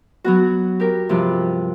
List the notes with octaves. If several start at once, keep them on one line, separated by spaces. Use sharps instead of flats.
F#3 B3 F#4
G4 A#4
G2 C3 F3